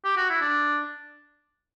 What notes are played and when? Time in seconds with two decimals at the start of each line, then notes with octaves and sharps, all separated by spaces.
0.04 G4
0.17 F#4
0.30 E4
0.41 D4